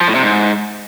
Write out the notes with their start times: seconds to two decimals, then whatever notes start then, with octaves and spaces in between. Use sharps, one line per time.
0.01 F3
0.08 A2
0.15 C3
0.23 G#2